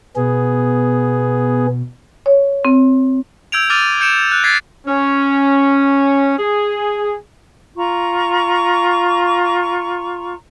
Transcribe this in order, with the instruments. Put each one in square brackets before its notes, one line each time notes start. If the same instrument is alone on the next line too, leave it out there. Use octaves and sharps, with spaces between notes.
[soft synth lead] B2 [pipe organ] B3 G#4
[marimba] C#5
C4
[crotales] E6 G6 G#6 D7 F7
D6 F6 A6 D#7 F7
G6 C#7 D7 E7
F#6
F#6 G#6 A6 B6 C7 F7
[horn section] C#4
G#4
[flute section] F4 A#5 C#6